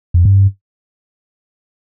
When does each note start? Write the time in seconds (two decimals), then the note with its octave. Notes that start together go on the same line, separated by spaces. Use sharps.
0.14 F2
0.25 G2